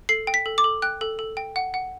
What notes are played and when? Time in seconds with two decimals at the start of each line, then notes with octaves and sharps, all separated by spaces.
0.09 A4 C7
0.27 G5
0.34 B6
0.46 A4
0.58 D6
0.64 A4
0.82 G5 F#6
1.01 A4
1.19 A4
1.37 G5
1.56 F#5
1.74 F#5